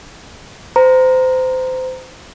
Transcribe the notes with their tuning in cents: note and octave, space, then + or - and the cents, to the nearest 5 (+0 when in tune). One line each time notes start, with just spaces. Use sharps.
C5 -25 A#5 +0